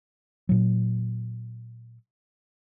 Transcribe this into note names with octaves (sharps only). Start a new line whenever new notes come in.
A#2 F#3